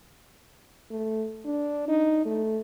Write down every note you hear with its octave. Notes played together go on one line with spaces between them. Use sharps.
A3
D4
D#4
A3